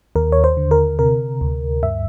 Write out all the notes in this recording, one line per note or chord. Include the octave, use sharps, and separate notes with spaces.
D#2 A#4
C#5
C5
D3
A#4
C3 A#4
D2
G2 E5